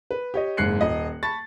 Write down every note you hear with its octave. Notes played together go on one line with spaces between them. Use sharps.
B4
G4 C#5 D#5
F#1 G#2 F#6 C7 C#7
D#1 D#5
A5 B5 C#6 A6